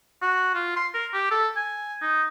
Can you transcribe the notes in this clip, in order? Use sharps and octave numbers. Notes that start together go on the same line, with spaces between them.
F#4
F4
C6
A#4
G4
A4
G#5
D#4